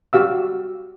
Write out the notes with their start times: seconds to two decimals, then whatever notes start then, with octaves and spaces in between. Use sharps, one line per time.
0.13 F#4 G4 F5 E6